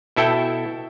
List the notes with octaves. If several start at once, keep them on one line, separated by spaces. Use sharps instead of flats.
B2 E4 A4 E5 G5